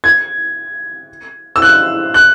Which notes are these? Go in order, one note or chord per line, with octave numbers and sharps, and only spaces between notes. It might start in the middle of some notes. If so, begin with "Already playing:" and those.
G#6
E6
F#6
F#6